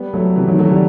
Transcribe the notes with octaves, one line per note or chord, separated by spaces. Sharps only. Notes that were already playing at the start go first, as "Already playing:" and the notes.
Already playing: G3 B3
F#3 A3
C3 E3
D#3 F#3
F#3 A3
E3 G3